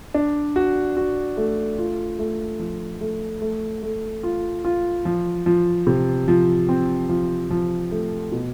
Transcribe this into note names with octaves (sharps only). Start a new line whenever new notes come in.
D4
F#4
F#4
A3
F4
A3
F3
A3
A3
A3
F4
F4
F3
F3
C3
F3
C4
F3
F3
A3
B2